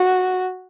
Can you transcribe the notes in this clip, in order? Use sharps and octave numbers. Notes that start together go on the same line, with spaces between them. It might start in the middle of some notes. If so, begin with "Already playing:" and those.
Already playing: F#4